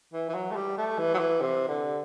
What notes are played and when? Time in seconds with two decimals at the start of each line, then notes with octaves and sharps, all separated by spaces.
0.13 E3
0.29 E3
0.34 F#3
0.51 A3
0.55 G3
0.77 A3
0.98 E3
1.14 F#3
1.19 E3
1.41 C3
1.68 D3